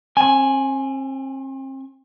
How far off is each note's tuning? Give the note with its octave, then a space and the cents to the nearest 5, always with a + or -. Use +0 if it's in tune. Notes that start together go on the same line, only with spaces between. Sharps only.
C4 +40 G#5 +0